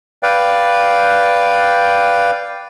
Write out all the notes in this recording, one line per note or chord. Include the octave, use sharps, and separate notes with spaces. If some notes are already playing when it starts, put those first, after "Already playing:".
B4 D5 F5 G5